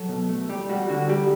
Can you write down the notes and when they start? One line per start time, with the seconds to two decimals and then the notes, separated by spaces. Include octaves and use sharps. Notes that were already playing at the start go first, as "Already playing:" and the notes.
Already playing: F#3 A4
0.09 B2
0.29 A3
0.49 G3 G4
0.69 G3 F#4
0.89 D3 F#4
1.09 G3 G4